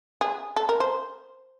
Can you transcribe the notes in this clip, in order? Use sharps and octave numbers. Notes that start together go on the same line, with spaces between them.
G#4
A4
A#4
C5